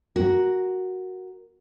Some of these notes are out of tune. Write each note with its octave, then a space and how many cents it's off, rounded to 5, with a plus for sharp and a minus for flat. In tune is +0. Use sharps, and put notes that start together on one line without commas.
F#4 +0 A#4 +0